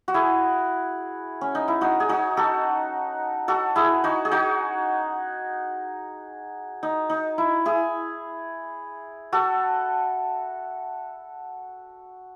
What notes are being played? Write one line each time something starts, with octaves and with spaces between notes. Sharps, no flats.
F#4
E4 G#4
C#4
D#4
E4
D#4 F#4
G#4
D#4 F#4
F#4 A4
F#4 A4
E4 G#4
D#4 F#4
G#4
D#4 F#4
D#4
D#4
E4
E4 G#4
F#4 A4